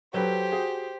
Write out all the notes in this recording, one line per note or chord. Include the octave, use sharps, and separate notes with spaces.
F#3 G4 A4 B4 C5
F#4 G#4